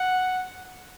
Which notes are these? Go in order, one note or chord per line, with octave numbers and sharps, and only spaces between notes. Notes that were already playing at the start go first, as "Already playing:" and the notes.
Already playing: F#5